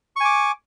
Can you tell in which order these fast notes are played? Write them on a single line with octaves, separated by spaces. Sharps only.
C#6 G#5 D6